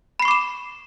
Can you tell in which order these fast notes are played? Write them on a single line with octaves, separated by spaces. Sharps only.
B5 C7 C#6 D6 E7